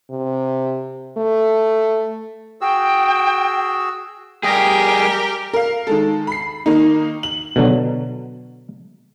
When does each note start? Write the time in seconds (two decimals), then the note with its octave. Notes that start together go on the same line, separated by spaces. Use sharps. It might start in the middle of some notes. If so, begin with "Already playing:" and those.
0.10 C3
1.17 A3
2.61 F#4 G#4 G5 E6
4.43 G3 G4 G#4 A#4 G5 D#6 A#6
5.53 A#4 F5
5.87 D#3 G#3 A4
6.27 B5 C7
6.66 D#3 A#3 D#4
7.23 F#7
7.56 B2 D3 F#3